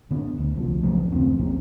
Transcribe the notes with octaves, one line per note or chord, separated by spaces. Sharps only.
D3 B3
D2
C2 F3
B1 C#3 F3 A3
F#1 D#2 F3 C4
B1 C#3 A#3